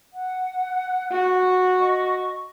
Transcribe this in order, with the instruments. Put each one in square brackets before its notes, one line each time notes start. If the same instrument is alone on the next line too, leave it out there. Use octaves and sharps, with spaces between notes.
[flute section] F#5
[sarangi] F#4
[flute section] D#5 C#6